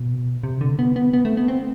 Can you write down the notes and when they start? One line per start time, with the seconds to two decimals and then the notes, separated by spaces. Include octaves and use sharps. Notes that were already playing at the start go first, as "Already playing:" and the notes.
Already playing: B2
0.43 C3
0.61 D3
0.79 B3
0.96 B3
1.13 B3
1.25 A3
1.37 B3
1.48 C4